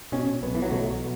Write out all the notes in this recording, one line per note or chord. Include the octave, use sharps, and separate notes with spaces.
B2 C#4
B1 B3
E3
F#3
B2 A3